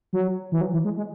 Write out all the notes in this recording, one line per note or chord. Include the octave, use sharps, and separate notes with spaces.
F#3
E3
F#3
E3
G#3
G#3